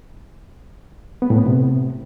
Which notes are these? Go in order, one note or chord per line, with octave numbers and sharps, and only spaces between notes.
B3
A2
B3
C3